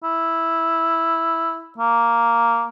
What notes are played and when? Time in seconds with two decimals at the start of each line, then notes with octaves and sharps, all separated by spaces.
0.04 E4
1.78 A#3